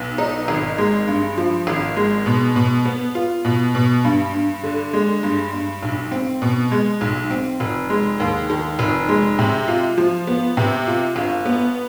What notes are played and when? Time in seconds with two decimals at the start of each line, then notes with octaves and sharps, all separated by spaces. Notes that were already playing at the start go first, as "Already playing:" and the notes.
Already playing: B1 B3
0.18 D#4
0.48 G#1
0.78 G#3
1.08 G2
1.37 F3
1.67 G#1
1.96 G#3
2.26 B2
2.56 B2
2.85 B3
3.15 F4
3.45 B2
3.75 B2
4.04 G2
4.34 G2
4.63 D3
4.93 G#3
5.23 G2
5.53 G2
5.83 B1
6.12 C4
6.42 B2
6.72 G#3
7.01 B1
7.31 C4
7.60 F1
7.90 G#3
8.20 D#2
8.50 D#3
8.79 F1
9.09 G#3
9.39 C3
9.68 F4
9.97 F3
10.27 B3
10.57 C3
10.87 F4
11.16 G1
11.46 B3